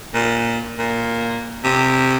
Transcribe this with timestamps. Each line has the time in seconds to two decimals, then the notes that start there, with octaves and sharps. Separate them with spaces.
0.14 A#2
0.78 A#2
1.64 C3